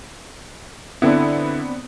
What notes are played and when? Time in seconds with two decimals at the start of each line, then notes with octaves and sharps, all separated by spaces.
1.02 D3 B3 C4 D4 E4